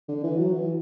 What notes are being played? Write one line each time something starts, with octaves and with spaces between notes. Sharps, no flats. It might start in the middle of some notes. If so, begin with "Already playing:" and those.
D3
E3
F#3
E3